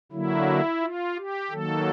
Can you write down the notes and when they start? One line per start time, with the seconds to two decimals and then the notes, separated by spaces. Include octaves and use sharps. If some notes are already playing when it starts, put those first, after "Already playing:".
0.12 D3 F#3 A#3 E4
0.81 F4
1.17 G4
1.51 D#3 F#3 A#3 A4